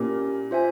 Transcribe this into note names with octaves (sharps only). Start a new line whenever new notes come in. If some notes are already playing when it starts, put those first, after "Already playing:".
Already playing: A#2 C#4 E4 G4 A#4
F4 C5 E5 G#5